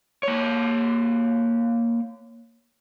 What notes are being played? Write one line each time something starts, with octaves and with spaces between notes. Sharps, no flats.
A#3 C#5